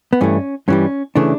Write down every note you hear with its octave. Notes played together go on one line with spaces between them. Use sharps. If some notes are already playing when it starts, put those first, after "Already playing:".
B3
G2 E3 A3 C#4
G2 E3 G3 C#4
C#3 E3 A3 D4